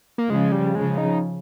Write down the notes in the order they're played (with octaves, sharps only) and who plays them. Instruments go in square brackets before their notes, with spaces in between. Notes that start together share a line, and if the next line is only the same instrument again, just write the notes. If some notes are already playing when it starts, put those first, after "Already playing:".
[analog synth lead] A#3
[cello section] C#3 F3 [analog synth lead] G#3
[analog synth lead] G3
[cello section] C#3 F3 [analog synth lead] G#3
[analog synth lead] D#4